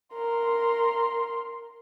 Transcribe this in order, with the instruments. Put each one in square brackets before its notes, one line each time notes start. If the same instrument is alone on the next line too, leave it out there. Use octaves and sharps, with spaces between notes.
[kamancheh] A#4 C6